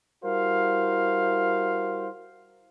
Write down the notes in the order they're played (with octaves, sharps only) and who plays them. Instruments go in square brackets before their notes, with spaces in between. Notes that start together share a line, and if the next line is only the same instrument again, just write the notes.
[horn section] G3 E4 F#4 A#4 C5 F5